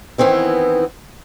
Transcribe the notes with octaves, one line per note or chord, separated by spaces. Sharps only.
D#3 E3 B3 C4 E4